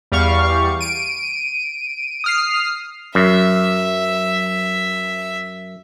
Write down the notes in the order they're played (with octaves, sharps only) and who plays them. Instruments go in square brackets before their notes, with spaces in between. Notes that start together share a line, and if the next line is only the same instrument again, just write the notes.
[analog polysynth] E2 G3 F5 C#6
D7 D#7
D#6 F6 C7
[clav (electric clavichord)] F#2 [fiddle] E5